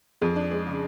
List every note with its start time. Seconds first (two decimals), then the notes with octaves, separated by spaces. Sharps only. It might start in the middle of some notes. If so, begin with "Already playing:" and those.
0.21 F2 G#4
0.36 D4
0.51 G#3
0.66 C#3